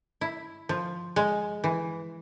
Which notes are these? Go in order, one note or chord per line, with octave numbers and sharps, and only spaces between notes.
E4
F3
G#3
E3